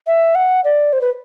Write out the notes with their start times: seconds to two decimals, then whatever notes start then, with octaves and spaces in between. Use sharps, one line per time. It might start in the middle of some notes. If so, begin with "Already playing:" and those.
0.07 E5
0.35 F#5
0.64 D5
0.93 C5
1.01 B4